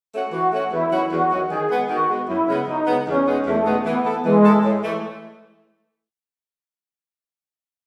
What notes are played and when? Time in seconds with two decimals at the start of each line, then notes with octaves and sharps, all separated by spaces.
0.12 A3 C#4 F#4
0.32 E3 F#4
0.51 A3 C#4 F#4
0.71 E2 E4
0.91 D#3 F#3 C#4 F#4
1.10 E2 F#4
1.30 D#3 F#3 C#4 F#4
1.49 D#3 G#4
1.70 G#3 B3
1.89 D#3 F#4
2.08 G#3 B3
2.28 F#2 E4
2.48 C#3 G#3 B3
2.67 F#2 D#4
2.87 C#3 G#3 B3
3.06 E2 C#4
3.27 B2 G#3 B3 D#4
3.46 E2 A3
3.66 B2 G#3 B3 D#4
3.85 E3 B3
4.05 A3 E4 A4
4.25 E3 G#3
4.45 A3 E4 A4
4.64 A2
4.83 E3 A3